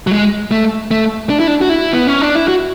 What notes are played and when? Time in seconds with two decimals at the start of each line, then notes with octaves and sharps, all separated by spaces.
0.07 F#3
0.12 G#3
0.51 A3
0.91 A3
1.30 D4
1.39 E4
1.47 D4
1.61 F#4
1.69 E4
1.93 B3
2.07 C#4
2.21 D4
2.35 E4
2.48 F#4